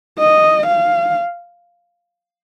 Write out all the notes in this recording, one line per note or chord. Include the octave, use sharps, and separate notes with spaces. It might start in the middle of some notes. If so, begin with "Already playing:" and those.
D#5
F5